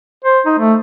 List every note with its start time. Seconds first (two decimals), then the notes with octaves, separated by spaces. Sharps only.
0.25 C5
0.46 D#4
0.59 A3